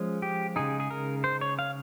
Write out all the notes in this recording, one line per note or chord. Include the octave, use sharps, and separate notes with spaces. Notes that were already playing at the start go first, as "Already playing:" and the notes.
Already playing: F3 G#3 C#4
G4
C#3 G#3 D#4 G#4
G#4
A#4
C5
C#5
F5